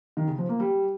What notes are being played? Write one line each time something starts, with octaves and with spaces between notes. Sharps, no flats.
D#3
C#3
F3
A#3
G3